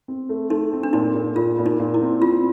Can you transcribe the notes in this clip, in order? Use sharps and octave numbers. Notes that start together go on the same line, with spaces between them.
C4
A3
A3 D#4
C4
D4
A#2 D#4
A#2
A#2 F4
A#2
D#4
A#2
E4
C4
C4 F4